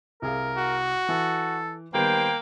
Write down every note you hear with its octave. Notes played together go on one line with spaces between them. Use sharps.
C2 G#4 A#4 F5
F#4
E3 A4
D#3 G3 A#3 B3 C5 G5